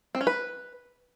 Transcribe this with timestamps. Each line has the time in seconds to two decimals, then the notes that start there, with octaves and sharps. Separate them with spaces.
0.15 C4
0.21 C#4
0.27 B4